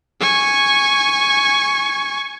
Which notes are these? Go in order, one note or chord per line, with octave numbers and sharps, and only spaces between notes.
G#5 C#6